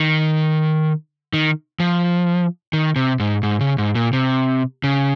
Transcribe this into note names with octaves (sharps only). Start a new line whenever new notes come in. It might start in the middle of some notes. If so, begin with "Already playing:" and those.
Already playing: D#3
D#3
F3
D#3
C3
G#2
G#2
C#3
G#2
A#2
C3
C#3